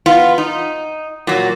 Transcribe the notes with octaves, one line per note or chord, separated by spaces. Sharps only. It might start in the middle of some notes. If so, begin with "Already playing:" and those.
B3 F4
D#4
A#2 F#3